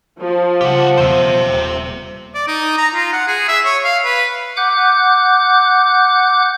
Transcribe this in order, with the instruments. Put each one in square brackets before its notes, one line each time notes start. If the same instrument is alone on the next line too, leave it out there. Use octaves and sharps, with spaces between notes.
[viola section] F3
[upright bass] C#3 G3 [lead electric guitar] G4 F#5
[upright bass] E2 B2 [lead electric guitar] C5 E5
[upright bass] D#1
[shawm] D5
D#4
A#5
F4
F#5
G#4
E5
C#5
F5
B4
[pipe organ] F#5 D6 F#6 G6